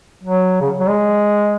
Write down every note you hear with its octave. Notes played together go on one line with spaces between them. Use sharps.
F#3
C#3
F#3
G#3